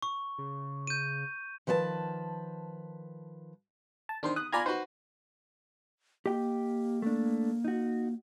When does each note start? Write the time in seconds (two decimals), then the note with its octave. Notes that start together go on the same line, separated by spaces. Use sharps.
0.02 C#6
0.38 C#3
0.87 G6 D#7
1.67 D#3 F3 B4 C#5 A5
4.09 A5
4.23 D#3 D4 C5 C6
4.36 D#6 F#6
4.52 F4 D5 G#5 A#5 B5 G#6
4.66 D#4 F#4 B4 C5
6.26 A#3 G4 D#5 G5
7.02 A3 D4
7.64 D#4 F#4